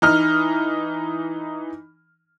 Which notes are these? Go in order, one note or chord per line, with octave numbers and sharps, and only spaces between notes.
E3 D#4 F6